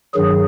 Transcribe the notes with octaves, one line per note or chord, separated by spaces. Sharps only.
G2 D#3 F#3 G#4